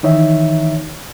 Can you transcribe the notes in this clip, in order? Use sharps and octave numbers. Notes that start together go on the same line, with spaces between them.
D#3 E3 D#4 C#5 E5